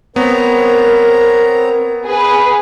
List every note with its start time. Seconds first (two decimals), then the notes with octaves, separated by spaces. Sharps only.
0.16 B3 C4 A#4 C#5 A#5
2.06 G#4 B4